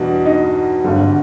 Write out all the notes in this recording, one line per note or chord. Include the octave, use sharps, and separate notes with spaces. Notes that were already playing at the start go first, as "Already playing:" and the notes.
Already playing: E2 B2 G3 D4
D#4
G#1 G2 D3 G3